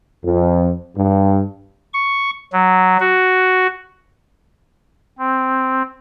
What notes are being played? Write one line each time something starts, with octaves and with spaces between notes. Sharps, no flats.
F2
G2
C#6
F#3
F#4
C4